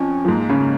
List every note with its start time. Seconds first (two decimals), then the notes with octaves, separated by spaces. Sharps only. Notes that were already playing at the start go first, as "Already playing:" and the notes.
Already playing: F2 F3 C#4
0.25 F3
0.28 G#2 G#3 A#3
0.50 C#3 C#4
0.60 A#3